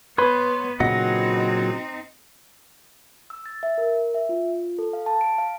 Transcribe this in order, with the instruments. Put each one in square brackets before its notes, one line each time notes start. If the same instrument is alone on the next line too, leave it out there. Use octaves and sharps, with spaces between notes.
[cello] B3 [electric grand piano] B4 [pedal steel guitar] C#5 C6
[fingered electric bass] A#2 C#3 [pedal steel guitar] F#3 D#5 F#5 [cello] C4 D#4
[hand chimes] E6
A6
E5
A#4
E5
F4
A4
F5
A5
D7
F5